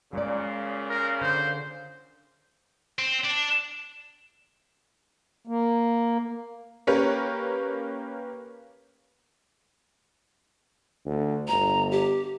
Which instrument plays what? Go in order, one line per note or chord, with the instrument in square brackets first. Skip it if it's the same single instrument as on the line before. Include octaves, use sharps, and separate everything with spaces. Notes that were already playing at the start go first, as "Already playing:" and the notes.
[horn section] A#2 C#3 [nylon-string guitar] G#3 D5
[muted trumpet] A#4
[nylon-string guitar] D3 [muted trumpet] C5
[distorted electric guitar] C4
D4
[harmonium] A#3
[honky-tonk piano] A#3 C#4 G4 A#4 B4 C#5
[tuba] D2
[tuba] G1 [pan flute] A#5
[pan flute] G4